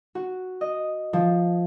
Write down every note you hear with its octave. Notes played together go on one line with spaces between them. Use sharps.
F#4
D#5
F3